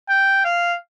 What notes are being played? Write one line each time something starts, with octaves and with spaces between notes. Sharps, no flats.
G5
F5